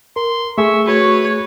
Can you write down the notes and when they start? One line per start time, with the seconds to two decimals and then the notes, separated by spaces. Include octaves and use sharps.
0.16 A#4 C6
0.58 A3 G#4 E5 C#6
0.87 F#4 B4 C#5